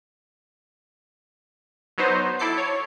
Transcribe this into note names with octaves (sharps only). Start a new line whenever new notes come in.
F#3 B3 D#4 C5
E4 A4 D6 C7
C#5